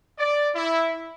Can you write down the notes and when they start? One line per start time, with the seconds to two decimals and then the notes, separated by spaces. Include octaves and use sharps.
0.19 D5
0.55 E4